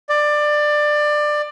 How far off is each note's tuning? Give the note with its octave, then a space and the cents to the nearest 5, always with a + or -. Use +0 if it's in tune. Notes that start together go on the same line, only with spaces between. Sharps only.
D5 +20